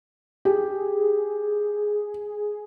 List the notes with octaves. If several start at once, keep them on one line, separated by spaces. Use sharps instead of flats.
G4 G#4